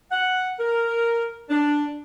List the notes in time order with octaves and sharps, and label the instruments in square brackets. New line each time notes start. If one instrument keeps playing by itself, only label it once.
[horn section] F#5
A#4
D4